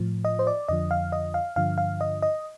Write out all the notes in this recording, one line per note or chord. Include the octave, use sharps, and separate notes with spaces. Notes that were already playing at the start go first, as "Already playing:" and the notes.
Already playing: A2 F3
D#5
C5
D5
F2 D3 F3 D#5
F5
D#5
F5
G2 D3 F3 F5
F5
D#5
D#5